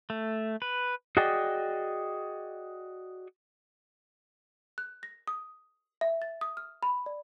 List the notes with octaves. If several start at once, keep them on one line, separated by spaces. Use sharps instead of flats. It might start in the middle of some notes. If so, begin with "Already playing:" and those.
A3
B4
F#4 G#4 D5 D#5 G5
F#6
A#6
D#6
E5
A6
D#6
F6
B5
D5